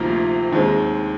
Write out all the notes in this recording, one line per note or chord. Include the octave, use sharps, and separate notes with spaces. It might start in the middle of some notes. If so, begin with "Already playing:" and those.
Already playing: D2 C3 F3 A#3 D#4
D#2 D#3 G#3 C4